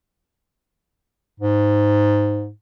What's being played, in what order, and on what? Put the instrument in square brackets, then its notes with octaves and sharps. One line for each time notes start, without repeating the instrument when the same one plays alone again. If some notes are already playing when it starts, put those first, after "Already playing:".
[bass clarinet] G#2